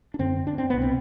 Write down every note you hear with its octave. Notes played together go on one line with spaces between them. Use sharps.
D4
F#2 D3 C4
D4
C4
C2 B2 B3
C4